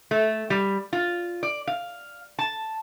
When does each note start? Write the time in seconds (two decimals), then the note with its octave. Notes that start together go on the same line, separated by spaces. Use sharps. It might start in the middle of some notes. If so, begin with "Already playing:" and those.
0.11 A3
0.50 G3
0.93 F4
1.43 D5
1.67 F5
2.39 A5